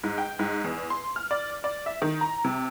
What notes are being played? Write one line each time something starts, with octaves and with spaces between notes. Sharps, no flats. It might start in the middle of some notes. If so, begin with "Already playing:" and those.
G#2
G5
G#2
E2
C6
F6
D5
D5
E5
D#3
A#5
C3